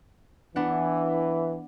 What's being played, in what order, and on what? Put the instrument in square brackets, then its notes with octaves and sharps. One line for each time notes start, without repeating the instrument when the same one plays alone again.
[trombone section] E3 [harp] B3 D4 F#5